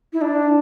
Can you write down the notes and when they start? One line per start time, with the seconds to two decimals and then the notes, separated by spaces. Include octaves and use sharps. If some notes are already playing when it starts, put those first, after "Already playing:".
0.13 E4
0.21 D4